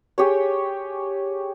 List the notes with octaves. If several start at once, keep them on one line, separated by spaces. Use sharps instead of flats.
G4 G#4 C#5